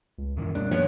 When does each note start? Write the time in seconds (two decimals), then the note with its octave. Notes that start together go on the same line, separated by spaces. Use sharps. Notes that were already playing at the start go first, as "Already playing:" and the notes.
0.18 C#2
0.37 F#2 A#2 D#3 E3
0.55 B2 G3 D4
0.71 D#3 F3 B3 C#5